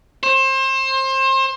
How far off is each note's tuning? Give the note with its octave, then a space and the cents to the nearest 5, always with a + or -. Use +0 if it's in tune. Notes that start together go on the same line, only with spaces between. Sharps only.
C5 +30